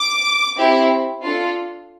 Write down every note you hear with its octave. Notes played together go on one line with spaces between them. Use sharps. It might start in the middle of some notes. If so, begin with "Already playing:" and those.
Already playing: D6
C4 E4 G4
D4 F4 A4